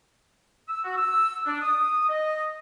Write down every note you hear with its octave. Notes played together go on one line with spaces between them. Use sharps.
E6
F#4
E6
D4
D#6
D#5